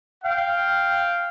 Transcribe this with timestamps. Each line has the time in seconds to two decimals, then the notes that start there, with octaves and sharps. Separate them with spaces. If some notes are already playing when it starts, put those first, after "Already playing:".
0.24 F5 G5